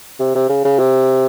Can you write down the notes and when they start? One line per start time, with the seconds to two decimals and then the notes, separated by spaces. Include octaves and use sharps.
0.19 C3
0.35 C3
0.49 C#3
0.65 C#3
0.79 C3